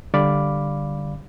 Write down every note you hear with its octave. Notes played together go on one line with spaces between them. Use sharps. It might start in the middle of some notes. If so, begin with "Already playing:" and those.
D3 G3 D5 F5 B5 D6